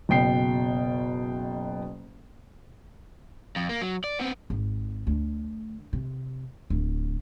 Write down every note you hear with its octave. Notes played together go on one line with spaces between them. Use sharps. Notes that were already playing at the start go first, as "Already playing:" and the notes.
F#1 B2 G5 C7
F2
A#3
F#3
D5
B3 C4
G#1
D2
C3
D1